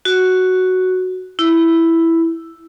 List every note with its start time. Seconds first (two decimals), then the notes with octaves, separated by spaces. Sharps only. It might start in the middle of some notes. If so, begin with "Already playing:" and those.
0.05 F#4
1.39 E4